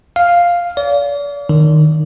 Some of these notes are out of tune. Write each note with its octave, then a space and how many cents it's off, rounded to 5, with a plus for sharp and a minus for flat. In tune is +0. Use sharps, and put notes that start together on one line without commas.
F5 +0
D5 -40
D#3 -20